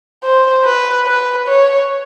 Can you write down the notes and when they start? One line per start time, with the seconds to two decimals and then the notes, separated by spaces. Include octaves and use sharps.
0.24 C5
0.65 B4
1.07 B4
1.48 C#5